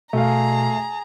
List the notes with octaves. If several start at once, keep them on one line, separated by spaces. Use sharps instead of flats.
B2 A3 G#4 F5 A#5